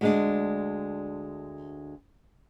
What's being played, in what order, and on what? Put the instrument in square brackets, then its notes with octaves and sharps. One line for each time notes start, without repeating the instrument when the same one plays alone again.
[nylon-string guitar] D2 G#3 D4